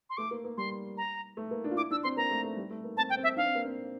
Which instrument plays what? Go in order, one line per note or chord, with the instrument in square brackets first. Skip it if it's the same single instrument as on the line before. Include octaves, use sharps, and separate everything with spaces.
[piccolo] C6
[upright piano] A3 [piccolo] D6
[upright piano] A#3
A#3
[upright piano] G3 [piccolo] C6
[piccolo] A#5
[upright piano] A3
A#3
D4
F4
[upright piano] E4 [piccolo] D6
[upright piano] D4 [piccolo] E6
[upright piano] C4 [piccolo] C6
[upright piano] A#3 [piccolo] A#5
[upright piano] A3
A3
G3
A3
A#3
[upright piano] C4 [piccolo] A5
[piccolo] G5
[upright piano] C4
[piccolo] E5
[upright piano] D4 [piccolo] F5
[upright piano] C4
A#3
C4